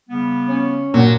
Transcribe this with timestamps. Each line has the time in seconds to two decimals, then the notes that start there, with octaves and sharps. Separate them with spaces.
0.10 C#3 G3 B3
0.49 C#4
0.94 A#2 F#3 D4